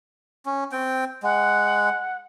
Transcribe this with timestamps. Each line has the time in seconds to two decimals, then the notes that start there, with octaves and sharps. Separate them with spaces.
0.46 C#4
0.72 C4 G5
1.23 G#3 F#5